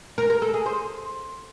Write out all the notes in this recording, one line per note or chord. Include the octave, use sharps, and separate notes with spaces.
A#4
A#4
A4
G#4
C5